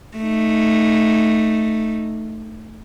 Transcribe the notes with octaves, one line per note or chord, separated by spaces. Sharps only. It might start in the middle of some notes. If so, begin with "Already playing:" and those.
A3 D#4